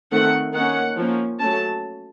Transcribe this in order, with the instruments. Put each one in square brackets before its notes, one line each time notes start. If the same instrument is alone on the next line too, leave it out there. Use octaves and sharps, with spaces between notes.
[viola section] D#3 A3 C4 F#5
D#3 A#3 C#4 F#5
F3 A#3 C#4
F#3 A3 C#4 A5